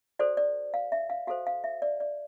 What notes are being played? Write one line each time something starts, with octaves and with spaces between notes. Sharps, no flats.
F#4 A4 C5 D5
D5
F5
E5
F5
F#4 A4 C5 F5
F5
E5
D5
D5